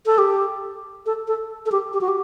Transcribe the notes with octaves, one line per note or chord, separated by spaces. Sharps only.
A4
G4
A4
A4
A4
G4
G4
F#4
G4